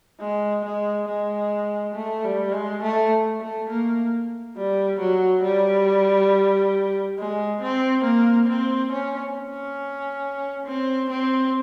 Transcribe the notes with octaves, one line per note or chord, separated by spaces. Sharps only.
G#3
G#3
G#3
A3
G3
G#3
A3
A3
A#3
G3
F#3
G3
G#3
C4
A#3
C4
C#4
C#4
C4
C4